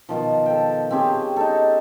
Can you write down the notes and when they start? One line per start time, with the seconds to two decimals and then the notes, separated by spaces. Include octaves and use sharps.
0.09 B2 D#3 F3
0.46 A4 G5
0.91 C4 C#4 G4 G#4
1.36 D#4 A4